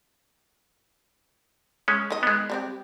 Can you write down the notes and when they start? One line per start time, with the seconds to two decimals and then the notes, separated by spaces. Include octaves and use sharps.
1.88 G#3 C#4
2.10 D#3 D#5
2.23 G#3 B3
2.50 G3 C4 G4